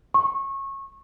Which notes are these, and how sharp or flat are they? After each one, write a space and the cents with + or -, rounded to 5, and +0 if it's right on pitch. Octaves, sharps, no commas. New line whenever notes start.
C#6 -25